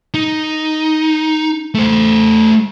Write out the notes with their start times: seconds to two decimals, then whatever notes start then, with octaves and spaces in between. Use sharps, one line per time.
0.14 D#4
1.75 A3 C5